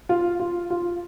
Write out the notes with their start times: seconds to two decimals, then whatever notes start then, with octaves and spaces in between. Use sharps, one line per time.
0.09 F4
0.40 F4
0.70 F4